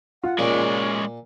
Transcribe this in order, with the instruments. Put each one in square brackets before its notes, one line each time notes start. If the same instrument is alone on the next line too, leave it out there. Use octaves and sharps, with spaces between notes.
[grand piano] F4 [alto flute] F#5
[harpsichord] A#2 [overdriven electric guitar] G#3 D5 [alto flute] C#4